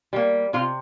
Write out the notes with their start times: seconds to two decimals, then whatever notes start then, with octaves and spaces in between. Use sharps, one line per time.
0.13 G3 A#3
0.53 C3 F4